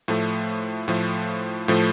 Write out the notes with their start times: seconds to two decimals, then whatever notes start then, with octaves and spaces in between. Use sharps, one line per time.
0.08 A2 F3 A3
0.88 A2 F3 A3
1.68 A2 F3 A3